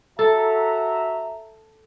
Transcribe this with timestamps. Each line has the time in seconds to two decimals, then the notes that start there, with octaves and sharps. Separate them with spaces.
0.19 F#4 A4 E5 A#5